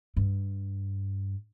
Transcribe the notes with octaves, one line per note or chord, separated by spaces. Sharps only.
G2